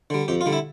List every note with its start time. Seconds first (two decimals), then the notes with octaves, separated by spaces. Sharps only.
0.10 D3 G3
0.28 F2 G4
0.41 F4
0.46 D3 G3
0.52 E4